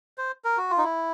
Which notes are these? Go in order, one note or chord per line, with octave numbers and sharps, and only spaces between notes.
C5
A#4
F#4
F4
D#4
E4